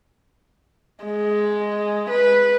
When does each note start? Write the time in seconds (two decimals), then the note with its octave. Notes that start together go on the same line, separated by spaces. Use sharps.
1.03 G#3
2.10 B4